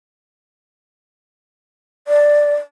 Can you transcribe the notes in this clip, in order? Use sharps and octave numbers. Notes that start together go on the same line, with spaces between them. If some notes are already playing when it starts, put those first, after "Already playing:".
D5